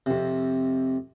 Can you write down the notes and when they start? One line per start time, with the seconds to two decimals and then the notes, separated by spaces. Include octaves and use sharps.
0.06 F2 C3